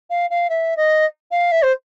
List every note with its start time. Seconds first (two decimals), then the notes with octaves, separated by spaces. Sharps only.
0.10 F5
0.30 F5
0.50 E5
0.77 D#5
1.31 F5
1.52 E5
1.62 C5